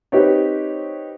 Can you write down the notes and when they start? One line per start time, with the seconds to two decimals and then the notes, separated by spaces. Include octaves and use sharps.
0.12 C4 D#4 G4 B4 C#5